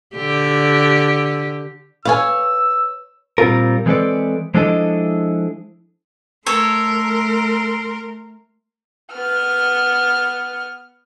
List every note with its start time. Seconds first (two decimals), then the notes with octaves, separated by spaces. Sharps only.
0.15 D3 G4
2.05 B4 C#5 F5 G#5 E6
3.38 A#2 G3 C4 F4 A#4
3.86 E3 G#3 C4 A4 B4 D5
4.54 F3 G#3 D4 E4 A4 D#5
6.46 A3 A4 A#4 C#5 C6
9.13 B3 F6